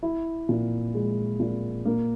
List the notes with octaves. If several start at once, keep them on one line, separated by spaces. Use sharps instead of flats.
E4
A#2
G#3
A#2
A#3